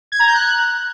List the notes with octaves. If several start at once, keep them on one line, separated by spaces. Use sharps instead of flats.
G#6
A#5
G6
F#6